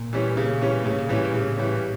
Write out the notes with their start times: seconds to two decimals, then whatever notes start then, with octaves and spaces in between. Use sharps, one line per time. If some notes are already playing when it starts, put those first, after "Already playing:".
Already playing: A#2
0.13 E3 G3 C#4
0.37 C#3
0.61 E3 G3 C#4
0.85 A2 C#3
0.98 A#2
1.09 A2 E3 G3 C#4
1.25 A#2
1.34 A2 C#3
1.57 E3 G3 C#4